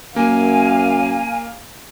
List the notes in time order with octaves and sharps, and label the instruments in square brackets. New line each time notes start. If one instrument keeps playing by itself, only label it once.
[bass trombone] F#2 [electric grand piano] A#3 [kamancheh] F5 [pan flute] G#5